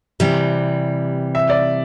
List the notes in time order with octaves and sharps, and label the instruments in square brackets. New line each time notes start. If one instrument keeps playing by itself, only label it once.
[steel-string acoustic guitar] C3 E3 G3
[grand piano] E5
D5